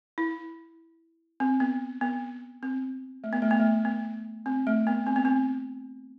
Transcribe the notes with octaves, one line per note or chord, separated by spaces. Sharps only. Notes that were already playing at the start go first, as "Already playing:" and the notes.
E4
C4
B3
B3
C4
A3
B3
A3
B3
A3
B3
C4
A3
B3
C4
B3
C4